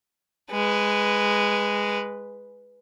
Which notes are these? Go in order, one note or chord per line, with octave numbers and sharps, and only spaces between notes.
G#3 B4